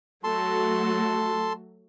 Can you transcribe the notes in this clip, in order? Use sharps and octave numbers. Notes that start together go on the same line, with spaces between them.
F#3 A3 F#4 A4 A5 C6